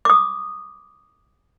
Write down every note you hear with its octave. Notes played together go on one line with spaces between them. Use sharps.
D6 D#6